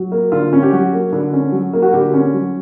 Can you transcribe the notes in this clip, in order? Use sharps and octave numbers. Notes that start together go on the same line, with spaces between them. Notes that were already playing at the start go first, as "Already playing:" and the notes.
Already playing: F#3
A#3
D3 F4
C#4
G4
F#3 F#4
A#3
D3
C#4
F#3
A#3
F#4
D3 G4
C#4
F#3